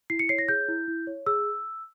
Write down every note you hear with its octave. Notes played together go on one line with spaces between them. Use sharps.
E4 C7
C#7
C#5 C7
A#6
G#4 G6
E4
E4
C#5
G#4 E6